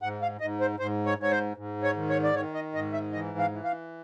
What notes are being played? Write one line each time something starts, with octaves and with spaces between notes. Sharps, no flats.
G#2 F#5
F5
G#2 D#5
C5
G#2 C5
C#5
G#2 C#5
C5
G#2
C#5
D#3
C#5
D5
D#3 C#5
D#5
G#2 D#5
E5
E3 D#5
F5
E3
F5